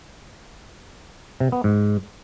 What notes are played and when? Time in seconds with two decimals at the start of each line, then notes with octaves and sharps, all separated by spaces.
1.40 C3
1.52 B3
1.64 G#2